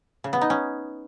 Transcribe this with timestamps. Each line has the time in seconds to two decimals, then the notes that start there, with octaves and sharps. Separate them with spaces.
0.24 C#3
0.33 B3
0.41 D#4
0.50 C#4